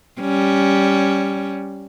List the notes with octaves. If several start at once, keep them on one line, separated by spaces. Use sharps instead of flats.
G3 C#4